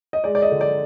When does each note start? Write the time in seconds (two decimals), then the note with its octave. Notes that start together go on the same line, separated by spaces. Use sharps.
0.13 D#5
0.24 G#3 D5
0.35 D5
0.42 D#5
0.51 D3
0.61 D5